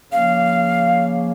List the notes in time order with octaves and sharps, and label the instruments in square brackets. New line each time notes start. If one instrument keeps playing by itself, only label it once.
[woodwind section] C#3 F3 A#3 [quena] F5